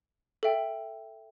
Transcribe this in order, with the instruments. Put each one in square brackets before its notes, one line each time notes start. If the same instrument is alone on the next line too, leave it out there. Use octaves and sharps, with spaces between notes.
[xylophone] A4 E5 G5